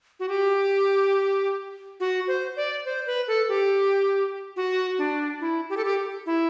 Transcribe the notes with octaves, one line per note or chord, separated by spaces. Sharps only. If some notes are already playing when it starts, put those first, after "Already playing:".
F#4
G4
F#4
C5
D5
C5
B4
A4
G4
F#4
D4
E4
G4
A4
G4
E4